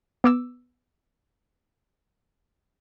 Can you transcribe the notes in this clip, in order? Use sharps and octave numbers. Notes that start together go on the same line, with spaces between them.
B3 D6 E6